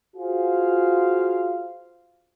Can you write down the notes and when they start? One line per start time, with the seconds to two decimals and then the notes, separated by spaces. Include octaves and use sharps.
0.16 F4 F#4 G#4 C5 F5